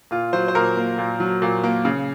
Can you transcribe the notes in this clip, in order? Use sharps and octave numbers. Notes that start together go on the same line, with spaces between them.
A#2 F4
F#3 C5
C5
A#2 A#4
A#3
A#2
F#3
A#2
A#3
C#3